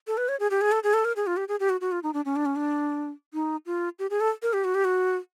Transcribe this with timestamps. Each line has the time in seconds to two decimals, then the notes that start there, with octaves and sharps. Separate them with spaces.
0.07 A4
0.17 B4
0.29 C#5
0.40 G#4
0.51 G4
0.61 G#4
0.72 A4
0.84 G#4
0.94 A4
1.05 A#4
1.16 G#4
1.27 F4
1.37 G4
1.48 G#4
1.60 G4
1.70 F#4
1.81 F#4
1.92 F4
2.03 D#4
2.14 D4
2.25 C#4
2.36 D4
2.46 C#4
2.56 D4
3.34 D#4
3.66 F4
3.99 G4
4.10 G#4
4.20 A4
4.42 A#4
4.53 G4
4.64 F#4
4.75 G4
4.85 F#4